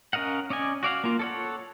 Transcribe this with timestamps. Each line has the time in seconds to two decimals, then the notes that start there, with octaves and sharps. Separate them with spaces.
0.13 C#4 A#4 D#5 F5 F#5
0.50 C#4 D5 D#5 G#5
0.83 F#4 D5 F5 F#5
1.04 A#3 F4
1.19 A4 C#5 F#5